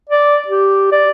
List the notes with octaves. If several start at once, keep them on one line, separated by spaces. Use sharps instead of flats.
D5
G4
D5